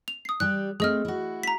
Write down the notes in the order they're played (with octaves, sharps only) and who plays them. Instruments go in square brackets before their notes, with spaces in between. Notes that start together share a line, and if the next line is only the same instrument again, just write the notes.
[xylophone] F7
D#6 C7
[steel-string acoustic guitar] G3 G4 D5 [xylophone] F#6
[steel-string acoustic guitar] A3 C4 [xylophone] G#4 D#5 F6
[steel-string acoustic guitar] E4 F#4
[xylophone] A#5 B6